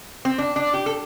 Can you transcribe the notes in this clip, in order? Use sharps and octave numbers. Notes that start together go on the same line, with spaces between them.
C4
D4
D4
G4
A4